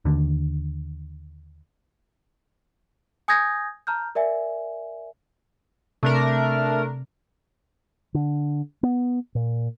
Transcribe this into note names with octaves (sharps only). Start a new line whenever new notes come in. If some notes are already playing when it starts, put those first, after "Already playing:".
D#2 D3
G#5 D#6 G6 G#6 A#6
A5 A#5 F6 G6
A#4 D5 E5 G#5
C3 A3 D4 A#4
D3
B3
A#2